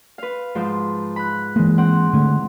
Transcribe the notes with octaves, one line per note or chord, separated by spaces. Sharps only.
B4 F5
G#2 F3
B5 F#6
E3 G#3 A#3
C4 F#5
D3 E3 A3